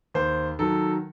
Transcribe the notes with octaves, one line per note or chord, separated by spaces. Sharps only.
D#2 C5
D#3 F#3 A4